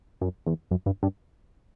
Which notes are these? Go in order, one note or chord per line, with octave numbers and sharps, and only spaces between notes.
F#2
E2
F#2
G2
G2